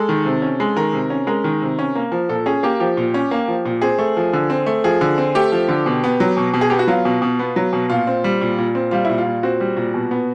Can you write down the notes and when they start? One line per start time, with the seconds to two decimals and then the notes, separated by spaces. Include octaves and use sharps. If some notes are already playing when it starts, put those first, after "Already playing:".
Already playing: G#3 A4
0.09 D#3
0.25 C3
0.42 C#4
0.60 G#3
0.76 D#3 A#4
0.93 C3
1.10 C#4
1.27 G#3 A#4
1.44 D#3
1.62 C3
1.79 C#4
1.95 A#3
2.12 F3
2.29 A#2 A4
2.46 C#4 G#4
2.63 A#3 G4
2.80 F3 G4
2.97 A#2
3.14 C#4
3.31 A#3
3.48 F3
3.65 A#2
3.82 C4 G#4
3.99 A3
4.17 F3
4.33 D3
4.50 C4
4.66 A3
4.84 F3 G#4
5.01 D3
5.18 C4
5.35 A3 G4
5.52 F3
5.68 D3
5.86 B2
6.04 B3
6.20 F#3
6.37 B2
6.54 B2
6.61 G#4
6.70 B3 G4
6.79 F#4
6.87 F#3 F4
7.05 B2
7.22 B2
7.39 B3
7.56 F#3
7.73 B2
7.90 A#2 F4
8.07 C4
8.24 G3
8.41 A#2
8.58 A#2
8.75 C4
8.91 G3 F4
9.05 A#2 E4
9.18 F4
9.26 A#2
9.43 C4 F#4
9.60 G3
9.77 A#2
9.94 B2
10.11 B3